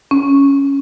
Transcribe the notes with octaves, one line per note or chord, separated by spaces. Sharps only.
C#4